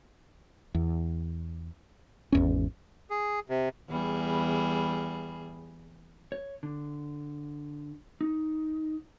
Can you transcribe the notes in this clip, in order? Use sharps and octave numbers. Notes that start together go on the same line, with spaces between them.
E2
G#1 E2 C#4
G#4
C3
E2 G3 G#4
C#5
D3
D#4